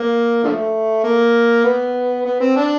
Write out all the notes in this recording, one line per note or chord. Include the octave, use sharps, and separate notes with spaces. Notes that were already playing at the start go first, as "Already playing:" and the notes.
Already playing: A#3
D3 F3 A3
A#3
B3
B3
C4
D4